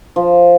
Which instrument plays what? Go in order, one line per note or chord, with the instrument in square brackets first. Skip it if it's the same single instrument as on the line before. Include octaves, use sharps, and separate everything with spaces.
[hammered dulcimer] F3